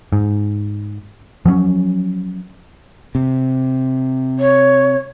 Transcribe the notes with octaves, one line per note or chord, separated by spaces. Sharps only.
G#2
F3 F#3 B3 C#4
C3
C#5